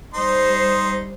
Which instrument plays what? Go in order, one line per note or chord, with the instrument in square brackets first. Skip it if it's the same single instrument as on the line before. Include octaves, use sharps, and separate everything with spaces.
[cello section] G3 C5 [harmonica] D#4 C6